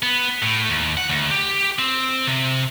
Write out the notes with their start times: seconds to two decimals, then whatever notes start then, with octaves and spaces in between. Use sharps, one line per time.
0.03 B3
0.42 A2
0.69 D#2
0.97 F#5
1.09 D2
1.31 G4
1.79 C4
2.27 C3